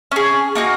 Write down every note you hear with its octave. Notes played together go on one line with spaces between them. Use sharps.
C#4 G#4
A#3 D#4 F#4